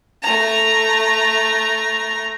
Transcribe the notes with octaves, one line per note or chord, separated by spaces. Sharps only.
A3 A#5